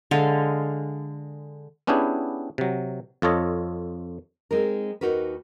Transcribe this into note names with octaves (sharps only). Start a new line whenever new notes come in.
D3 G#3 F5
B3 C#4 D4 E4 G4 G#4
C3 F#3
F2 F4 A4 C#5 D#5
G#3 C4 D#4 A#4
D#2 A#2 D#4 F#4 A#4 B4